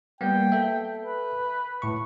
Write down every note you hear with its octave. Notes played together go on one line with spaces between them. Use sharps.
G3 A#3 B3 G5
A4 E5
B4
A2 C#6